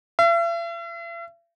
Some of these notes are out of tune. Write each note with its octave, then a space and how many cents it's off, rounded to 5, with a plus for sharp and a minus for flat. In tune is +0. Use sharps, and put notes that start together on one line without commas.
E5 +45